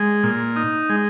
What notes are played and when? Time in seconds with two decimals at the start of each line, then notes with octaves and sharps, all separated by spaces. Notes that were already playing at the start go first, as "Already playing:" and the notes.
Already playing: G#3
0.23 A#2
0.56 D#4
0.90 G#3